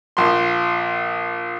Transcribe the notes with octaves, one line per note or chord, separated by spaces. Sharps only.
A#1 C6